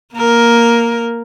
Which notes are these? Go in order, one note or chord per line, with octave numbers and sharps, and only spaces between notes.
A#3 A#4